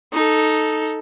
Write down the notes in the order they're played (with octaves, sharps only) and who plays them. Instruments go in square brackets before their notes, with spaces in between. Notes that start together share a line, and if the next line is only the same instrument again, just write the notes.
[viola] D#4 A4